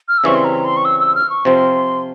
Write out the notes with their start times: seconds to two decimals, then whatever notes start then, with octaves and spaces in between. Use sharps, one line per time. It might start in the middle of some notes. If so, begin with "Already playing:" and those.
0.08 F6
0.18 E6
0.24 C#3 E3 G3 C4 C#6
0.35 C6
0.45 A#5
0.65 C6
0.77 C#6
0.85 E6
1.00 E6
1.15 F6
1.30 C#6
1.45 C3 F3 C4 C6